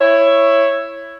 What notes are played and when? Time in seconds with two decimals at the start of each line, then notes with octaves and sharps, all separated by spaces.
0.01 E4 C#5